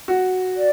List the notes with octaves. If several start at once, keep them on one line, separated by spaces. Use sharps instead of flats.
F#4
D5